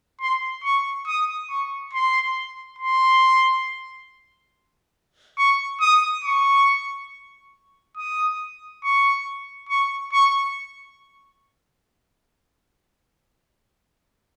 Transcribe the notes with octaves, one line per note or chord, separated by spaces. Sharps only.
C6
C#6
D#6
C#6
C6
C6
C#6
D#6
C#6
D#6
C#6
C#6
C#6